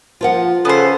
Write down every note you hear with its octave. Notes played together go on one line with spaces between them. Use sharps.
F3 F4 A#4 F#5
C#3 B3 A4 C5